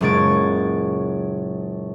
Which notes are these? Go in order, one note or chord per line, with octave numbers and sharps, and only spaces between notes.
F#1 A#2 G#3 C#5 A6 D7